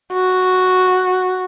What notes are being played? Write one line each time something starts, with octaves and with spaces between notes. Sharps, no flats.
F#4